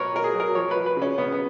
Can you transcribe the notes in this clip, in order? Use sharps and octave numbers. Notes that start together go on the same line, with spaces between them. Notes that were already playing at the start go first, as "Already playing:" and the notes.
Already playing: B2 F#3 A#4 B4 C#5
B2 A#4
G#4
F#3
A#4
F3 C#5
F3 B4
B4
C#3 C#4
C#3 B3
B3